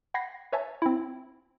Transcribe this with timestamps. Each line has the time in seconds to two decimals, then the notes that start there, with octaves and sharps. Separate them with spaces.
0.14 F#5 G5 B5 G#6 A#6 C7
0.52 B4 C#5 E5 G#5 A5
0.82 C4 E4